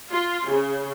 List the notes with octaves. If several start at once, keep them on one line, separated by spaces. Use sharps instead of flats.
F4
C#3